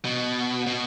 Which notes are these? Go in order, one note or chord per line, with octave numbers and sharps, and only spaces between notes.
B2
B2